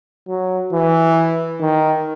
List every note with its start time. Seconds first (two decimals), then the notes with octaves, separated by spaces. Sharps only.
0.28 F#3
0.73 E3
1.61 D#3